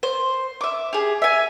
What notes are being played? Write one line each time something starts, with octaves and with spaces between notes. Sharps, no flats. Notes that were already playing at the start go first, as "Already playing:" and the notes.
C5
E5 D6
G4 G#4
E5 G#5